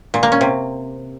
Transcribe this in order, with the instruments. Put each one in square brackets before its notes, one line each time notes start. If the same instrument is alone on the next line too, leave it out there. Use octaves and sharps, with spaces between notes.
[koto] A#2
A#3
C#4
C3